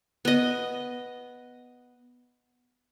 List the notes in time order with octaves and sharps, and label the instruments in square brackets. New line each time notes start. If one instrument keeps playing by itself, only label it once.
[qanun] B3 D#5